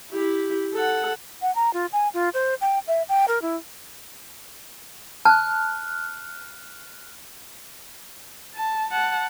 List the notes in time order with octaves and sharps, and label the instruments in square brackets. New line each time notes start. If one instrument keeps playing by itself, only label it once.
[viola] E4 G4
A4 F#5
[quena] F#5
A#5
F4
G#5
F4
C5
G5
E5
G5
A#4
E4
[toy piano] A5 [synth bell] F6 F#6
[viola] A5
F#5 A5